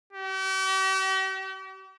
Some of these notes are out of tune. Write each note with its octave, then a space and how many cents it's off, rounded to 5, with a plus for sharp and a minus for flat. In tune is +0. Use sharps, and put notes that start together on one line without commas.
G4 -45